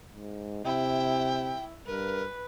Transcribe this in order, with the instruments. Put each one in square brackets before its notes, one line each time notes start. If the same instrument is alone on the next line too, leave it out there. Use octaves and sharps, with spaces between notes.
[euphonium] G#2
[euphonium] C3 [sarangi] E4 [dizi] G5
[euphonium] G2 [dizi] A#4 [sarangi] B4